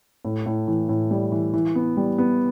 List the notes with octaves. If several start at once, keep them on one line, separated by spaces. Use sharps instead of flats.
A2
A2
E3
A2
G3
E3
E3
B3
G3
B3